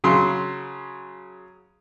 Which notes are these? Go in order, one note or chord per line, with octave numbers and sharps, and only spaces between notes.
C#3 F#3 C6